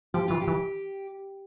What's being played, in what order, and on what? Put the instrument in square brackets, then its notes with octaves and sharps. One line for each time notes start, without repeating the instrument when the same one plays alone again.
[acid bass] F3 [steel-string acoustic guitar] G4
[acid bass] E3 [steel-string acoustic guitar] F4
[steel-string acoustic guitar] G4
[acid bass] E3